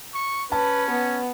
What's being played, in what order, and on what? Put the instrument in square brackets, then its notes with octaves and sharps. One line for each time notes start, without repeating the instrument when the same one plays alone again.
[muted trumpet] C#6
[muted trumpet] C#4 [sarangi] B4 [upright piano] A5
[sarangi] B3